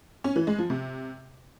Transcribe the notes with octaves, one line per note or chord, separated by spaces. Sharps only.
C#4
E3
G#3
F3
C3